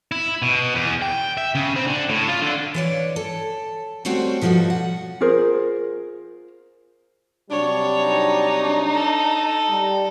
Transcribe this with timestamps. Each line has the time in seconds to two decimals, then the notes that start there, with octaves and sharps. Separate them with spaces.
0.12 E4
0.42 B2
0.75 E2
1.02 G5
1.37 E5
1.55 C#3
1.76 C4
1.87 D3
2.09 A2
2.28 F4
2.42 D3
2.74 E3 C#5 D5
3.16 A4
4.05 G3 A3 C4 F#4 C5 C#5
4.41 B2 F3 G3 F#4 A4
4.70 F#5
5.21 F4 G#4 A#4 C5
7.51 C3 F#3 G3 D4 C#5
8.01 D#4
8.93 A4
9.69 G3